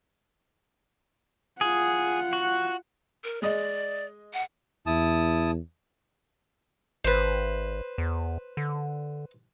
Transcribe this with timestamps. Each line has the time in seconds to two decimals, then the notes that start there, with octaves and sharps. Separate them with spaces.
1.61 F4 G#4 F#5
2.33 F#4
3.24 A#4
3.42 G#3 D5 D#5
4.33 F#5
4.86 E2 E4 A5 D#6
7.05 G#1 B4 C5
7.98 E2
8.57 D3